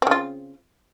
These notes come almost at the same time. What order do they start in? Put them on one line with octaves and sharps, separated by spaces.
C4 C#3 F4